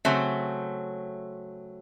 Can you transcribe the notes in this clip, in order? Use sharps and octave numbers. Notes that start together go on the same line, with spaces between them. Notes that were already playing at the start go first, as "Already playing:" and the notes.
C#3 F#3 A3 C4